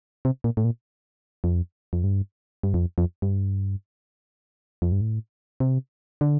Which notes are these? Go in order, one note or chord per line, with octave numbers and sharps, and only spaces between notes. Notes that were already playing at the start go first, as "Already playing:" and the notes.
C3
A#2
A2
A#2
F2
F2
G2
G2
F2
F2
G2
F2
G2
A2
C3
D3